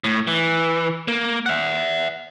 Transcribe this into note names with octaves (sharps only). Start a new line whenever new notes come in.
A2
E3
A#3
E5 F#5